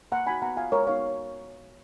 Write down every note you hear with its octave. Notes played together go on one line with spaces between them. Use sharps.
A#3 F#5 A#5
D#4 F#4 G#5 B5
B3 F#5 A#5
F4 F5 G#5
G#3 A#4 C#5
B3 D#4 F#4 C#5 F5